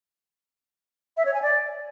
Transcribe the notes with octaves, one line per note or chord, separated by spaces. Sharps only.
E5
C#5
G#5
D5